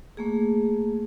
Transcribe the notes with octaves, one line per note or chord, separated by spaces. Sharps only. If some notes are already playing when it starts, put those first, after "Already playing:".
A3 A#3 G#4